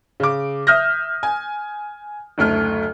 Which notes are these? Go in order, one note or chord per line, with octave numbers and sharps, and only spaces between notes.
C#3 D6
E5 D#6 F6 G6 A#6
G#5
F#1 D2 A3 F6